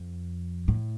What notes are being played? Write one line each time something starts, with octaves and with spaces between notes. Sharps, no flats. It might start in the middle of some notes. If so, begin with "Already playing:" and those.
Already playing: F2
A2